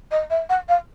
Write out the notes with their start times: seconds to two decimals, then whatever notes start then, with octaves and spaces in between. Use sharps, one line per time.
0.11 D#5
0.30 E5
0.49 F#5
0.69 F5